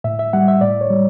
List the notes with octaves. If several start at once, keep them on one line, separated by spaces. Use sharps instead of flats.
A2 E5
E5
G3 F#5
E5
A2 D5
C#5
G3